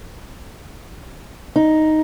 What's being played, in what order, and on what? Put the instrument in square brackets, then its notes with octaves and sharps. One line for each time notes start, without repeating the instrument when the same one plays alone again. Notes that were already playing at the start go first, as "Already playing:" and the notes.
[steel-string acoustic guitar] D#4